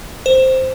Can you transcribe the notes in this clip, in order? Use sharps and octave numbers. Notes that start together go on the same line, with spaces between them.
C5